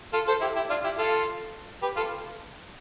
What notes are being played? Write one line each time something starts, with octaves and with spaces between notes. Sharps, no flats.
F4 A4
A4 C5
E4 G4
E4 G4
D4 F4
E4 G4
F4 A4
G4 B4
F4 A4